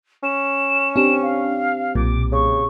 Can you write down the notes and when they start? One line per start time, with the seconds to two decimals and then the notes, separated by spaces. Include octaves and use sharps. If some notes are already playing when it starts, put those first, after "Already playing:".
0.23 C#4 E7
0.96 C4 D4 G4 E7
1.22 F5
1.95 B1 A#2 D6
2.32 C#3 C#6